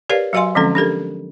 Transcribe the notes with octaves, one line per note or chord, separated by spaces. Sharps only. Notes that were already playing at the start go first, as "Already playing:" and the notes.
G4 A#4 B4 C#5 D5 F5
F#3 F#4 D#5 F5 G#5 C6
D3 F3 G#3 C4 C#4 A4
D4 G4 A4 A#4